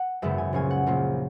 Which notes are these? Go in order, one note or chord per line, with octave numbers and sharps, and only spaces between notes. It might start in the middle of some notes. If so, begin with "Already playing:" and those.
Already playing: F#5
G#1 F#2 C#3 G#3 B3 E5
G#5
A#1 A#2 A#3 C#4 G#5
F#5
A#1 A#2 A#3 C#4